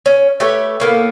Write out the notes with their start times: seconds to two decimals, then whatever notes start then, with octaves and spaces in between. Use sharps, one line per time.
0.06 C#4
0.40 A3 G4 B4 C#5
0.80 A2 A#3 B3